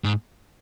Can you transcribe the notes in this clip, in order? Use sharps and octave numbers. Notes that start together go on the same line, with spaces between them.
G#2